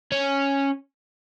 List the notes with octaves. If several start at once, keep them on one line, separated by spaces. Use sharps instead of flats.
C#4